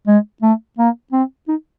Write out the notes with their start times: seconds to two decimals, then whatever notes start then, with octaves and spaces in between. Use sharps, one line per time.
0.07 G#3
0.42 A3
0.78 A#3
1.12 C4
1.48 D#4